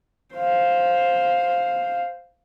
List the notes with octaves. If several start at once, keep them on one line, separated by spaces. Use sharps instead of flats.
C5 F5